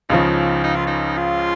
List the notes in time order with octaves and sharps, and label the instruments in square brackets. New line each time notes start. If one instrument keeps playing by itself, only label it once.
[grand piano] C#2 C#3 F3 [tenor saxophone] D#4
[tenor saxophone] D#4
F4
D#4
F4